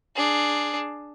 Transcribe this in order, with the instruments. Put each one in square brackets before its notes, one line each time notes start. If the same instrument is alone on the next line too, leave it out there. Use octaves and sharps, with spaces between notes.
[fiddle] D4 G#4